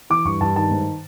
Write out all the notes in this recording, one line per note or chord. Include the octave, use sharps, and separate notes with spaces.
E3 D6
G2 C#6
G2 A5
D#3 A5
G#2